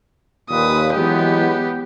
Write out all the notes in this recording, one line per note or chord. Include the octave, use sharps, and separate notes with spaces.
D#2 A#2 B4 D#6
E3 F#3 G#3 B3 G4